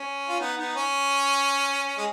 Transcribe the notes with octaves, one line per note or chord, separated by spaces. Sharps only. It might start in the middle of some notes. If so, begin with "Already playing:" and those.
Already playing: C#4
F4
B3 D#4
B3 D#4
C#4
G#3